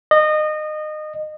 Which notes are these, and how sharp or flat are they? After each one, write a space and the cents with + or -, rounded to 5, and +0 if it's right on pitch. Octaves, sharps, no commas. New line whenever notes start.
D#5 -25